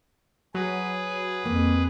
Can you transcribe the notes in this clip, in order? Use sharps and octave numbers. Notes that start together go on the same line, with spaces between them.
F#3 G#4 B4
F2 A#3